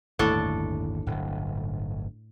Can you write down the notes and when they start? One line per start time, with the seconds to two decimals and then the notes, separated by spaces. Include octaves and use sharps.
0.19 G1 D#2 A2 D4 A4
1.06 D1 G1